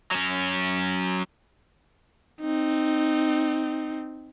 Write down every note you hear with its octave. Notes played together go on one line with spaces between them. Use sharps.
F#3 C#4
C4 D#4